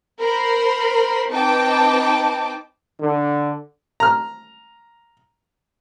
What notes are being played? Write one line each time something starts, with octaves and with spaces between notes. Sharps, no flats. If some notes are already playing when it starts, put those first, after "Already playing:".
A#4 C5 B5 C6
C4 D#4 B4 G5 A5 D6
D3
A#5 F6